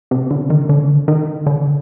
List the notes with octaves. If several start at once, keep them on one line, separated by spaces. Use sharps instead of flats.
C3
D3
D#3
D3
D#3
D3